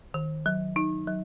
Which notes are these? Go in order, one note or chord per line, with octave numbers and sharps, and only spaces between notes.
D#3
F#3
D#4
F#3